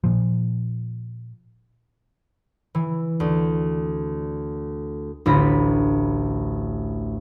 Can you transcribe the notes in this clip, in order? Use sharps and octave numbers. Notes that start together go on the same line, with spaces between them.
A#2 F3
E3
D2
A1 D2 F4 B5 A#6 B6